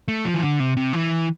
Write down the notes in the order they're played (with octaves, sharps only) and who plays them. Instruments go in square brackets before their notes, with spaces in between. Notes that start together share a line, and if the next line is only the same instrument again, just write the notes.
[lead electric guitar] A3
F3
E3
D3
C3
C3
E3